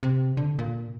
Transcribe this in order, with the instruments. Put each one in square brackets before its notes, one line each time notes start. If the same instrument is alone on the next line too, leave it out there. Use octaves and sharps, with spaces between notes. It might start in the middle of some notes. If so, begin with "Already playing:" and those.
[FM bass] C3
D3
A#2